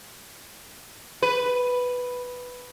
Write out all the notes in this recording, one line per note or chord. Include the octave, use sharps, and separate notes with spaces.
B4